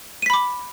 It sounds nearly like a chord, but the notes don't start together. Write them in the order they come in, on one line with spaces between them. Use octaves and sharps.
D#7 B6 B5 D6